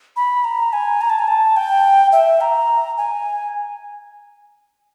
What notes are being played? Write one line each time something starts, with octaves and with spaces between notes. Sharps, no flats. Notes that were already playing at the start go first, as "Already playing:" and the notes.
B5
A#5
G#5
A#5
A5
G#5
A5
G5
E5
A#5
G#5